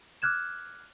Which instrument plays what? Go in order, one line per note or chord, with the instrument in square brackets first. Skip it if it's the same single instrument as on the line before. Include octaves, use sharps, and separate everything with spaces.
[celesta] D6 F6 F#6 G#6 E7